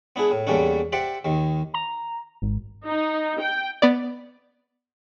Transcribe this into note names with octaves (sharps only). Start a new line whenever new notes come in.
B3 D4 E4 G#4
A2
E2 D3 G3 A#3 C#4 D4
G4 C5 D5 E5 F#5 G5
D#2 D#3
A#5
G#1
D#4
G5
B3 D5